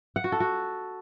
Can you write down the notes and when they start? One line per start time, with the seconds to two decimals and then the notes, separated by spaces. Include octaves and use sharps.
0.16 F#5
0.24 F#4
0.32 A4
0.40 F#4